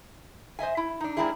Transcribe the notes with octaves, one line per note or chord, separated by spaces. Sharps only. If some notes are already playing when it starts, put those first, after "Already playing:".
C5 D#5 E5 G#5
E4
D4 D#4
G3 A#3 C4 D4 E4 G#4